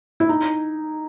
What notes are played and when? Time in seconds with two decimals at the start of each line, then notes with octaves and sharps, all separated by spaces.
0.20 E4
0.29 D#4